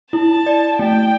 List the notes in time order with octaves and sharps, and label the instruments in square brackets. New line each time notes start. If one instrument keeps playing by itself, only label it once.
[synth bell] E4 [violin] A5
[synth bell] D5
[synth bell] A3 [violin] G5